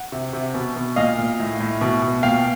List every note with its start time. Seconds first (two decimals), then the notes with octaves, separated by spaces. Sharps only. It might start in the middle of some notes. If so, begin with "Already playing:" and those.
Already playing: F#5
0.12 C3
0.33 C3
0.54 B2
0.76 B2
0.96 A#2 D#5 F5
1.19 A#2
1.40 A2
1.60 A2
1.81 B2
2.02 B2
2.23 A#2 F5 G5